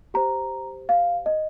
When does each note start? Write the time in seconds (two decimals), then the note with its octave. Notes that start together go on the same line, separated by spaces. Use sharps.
0.14 G4 C5 A#5
0.89 F5
1.26 D#5